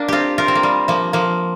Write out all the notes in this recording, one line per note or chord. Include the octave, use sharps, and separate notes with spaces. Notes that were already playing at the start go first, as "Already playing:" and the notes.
Already playing: A#3 D4
C4 F4 G4
F4 A#4
C4
A#3
G3
F3 A#3
F3 A#3